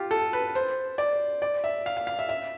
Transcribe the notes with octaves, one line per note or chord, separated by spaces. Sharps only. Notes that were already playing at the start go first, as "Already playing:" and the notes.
Already playing: F4 G4
A4
B4
C5
D5
D5
E5
F5
F5
F5
E5
E5